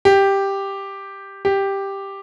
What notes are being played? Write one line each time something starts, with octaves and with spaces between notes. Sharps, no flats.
G4
G4